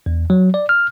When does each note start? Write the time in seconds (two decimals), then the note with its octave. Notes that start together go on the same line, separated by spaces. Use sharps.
0.06 E2
0.30 F#3
0.54 D5
0.69 F6